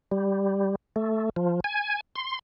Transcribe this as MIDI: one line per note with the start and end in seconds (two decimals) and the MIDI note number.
0.11 0.75 55
0.96 1.30 57
1.36 1.60 53
1.64 2.01 80
2.16 2.39 84